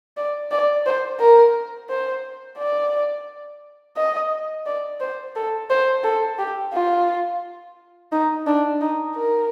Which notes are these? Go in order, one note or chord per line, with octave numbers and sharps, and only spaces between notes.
D5
D5
C5
A#4
C5
D5
D#5
D5
C5
A4
C5
A4
G4
F4
D#4
D4
D#4
A#4